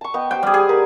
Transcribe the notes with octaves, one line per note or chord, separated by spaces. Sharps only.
A5 C#6
B3 D#5 G5
C5 G5
G3 G#4 F#5
G#4
A#4 B4 D5